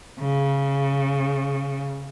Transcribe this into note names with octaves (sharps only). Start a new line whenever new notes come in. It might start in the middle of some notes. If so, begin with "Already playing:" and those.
C#3